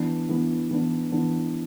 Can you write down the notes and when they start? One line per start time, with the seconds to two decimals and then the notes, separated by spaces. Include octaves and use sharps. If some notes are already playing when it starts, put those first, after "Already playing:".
Already playing: E3 B3 D4
0.29 E3 B3 D4
0.71 E3 B3 D4
1.12 E3 B3 D4